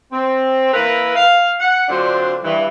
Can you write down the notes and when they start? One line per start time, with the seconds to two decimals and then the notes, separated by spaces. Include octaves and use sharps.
0.12 C4
0.73 E3 A#3 A#4 B4
1.16 F5
1.59 F#5
1.89 D3 F#3 C4 D4 F4 C5
2.43 G2 E3